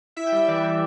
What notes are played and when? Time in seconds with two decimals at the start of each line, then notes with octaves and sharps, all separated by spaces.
0.16 E4 E5
0.26 G5
0.32 G3 E5
0.48 E3 D5
0.64 E3